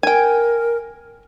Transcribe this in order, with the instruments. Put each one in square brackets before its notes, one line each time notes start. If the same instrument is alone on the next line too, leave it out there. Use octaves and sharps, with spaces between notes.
[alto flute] A#4 [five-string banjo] G5 G#5